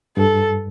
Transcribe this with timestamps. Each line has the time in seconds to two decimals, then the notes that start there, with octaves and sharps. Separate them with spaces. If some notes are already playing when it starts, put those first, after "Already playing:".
0.17 G2 A4